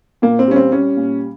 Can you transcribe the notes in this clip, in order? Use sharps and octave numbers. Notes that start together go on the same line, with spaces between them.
A#2 A#3
C4
G3 C#4
C4
G3 C#4
A#2